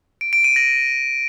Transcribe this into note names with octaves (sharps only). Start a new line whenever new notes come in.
D7
D7
D#7
A#6